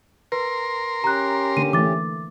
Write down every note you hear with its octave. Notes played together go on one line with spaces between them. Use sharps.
A#4 B4 C6
C#4 G4 A#5 F#6
D3 A#3 D#7
E3 A3 D6 A6